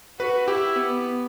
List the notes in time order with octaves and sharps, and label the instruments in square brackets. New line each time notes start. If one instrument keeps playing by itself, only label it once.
[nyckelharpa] F#4 [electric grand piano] B4
[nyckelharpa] E4 [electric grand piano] G4
[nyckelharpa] B3